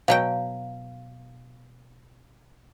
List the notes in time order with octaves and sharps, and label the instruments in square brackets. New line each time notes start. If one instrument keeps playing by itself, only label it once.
[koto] B2 F#3 G5 [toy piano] F5